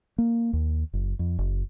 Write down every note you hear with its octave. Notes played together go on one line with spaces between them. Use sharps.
A#3
D#2
F#1
F2
F#1